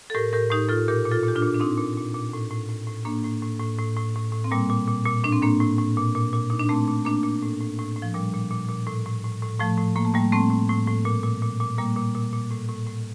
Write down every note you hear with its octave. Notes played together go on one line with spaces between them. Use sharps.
A4
A2 G4 A#4
A2 G4 A#4
A2 D#4 G4
A2 F4 A4
A#2 G4 A#4
A#2
F4 A4
A#2 G4
D4 F4
A#2
D4
A#2 C4 D#4
A#2
A#2
A#2
A2
A2
A2
A2
A2 A#3 D4
A2
A2
A2
A2
A2
A2
A2
C4
A#2 G3 A#3
A#2
A#2
A#2
A2 D4
C4
A2 A#3 D4
A2
A2
A#2
A#2
A#2
A#2 D#4
D4
A#2 A3 C4
A#2
A#2 A#3 D4
A#2
A2
A2
A2
A2
F3
A#2 G3
A#2
A#2
A#2
A2
A2
A2
A2
A2 F3 A3
A2
A2 A#3
A3
A2 G3 A#3
A2 A3 C4
A2
A2
A2
A#2
A#2
A#2
A#2
A#2 G3 A#3
A#2
A#2
A#2
A2
A2
A2